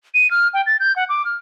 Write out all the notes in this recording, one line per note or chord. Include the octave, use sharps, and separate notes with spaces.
D#7
F6
G5
A6
G6
F#5
D6
F6